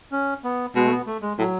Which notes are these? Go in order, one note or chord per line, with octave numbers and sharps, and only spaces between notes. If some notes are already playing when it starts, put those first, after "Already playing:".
C#4
B3
B2 G#3
A3
B3
A3
G#3
A2 F#3